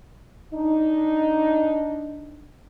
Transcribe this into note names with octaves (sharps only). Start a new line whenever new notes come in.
D4 D#4